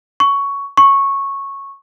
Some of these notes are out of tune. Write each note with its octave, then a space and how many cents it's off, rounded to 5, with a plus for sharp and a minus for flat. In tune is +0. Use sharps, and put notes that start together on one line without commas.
C#6 +10
C#6 -10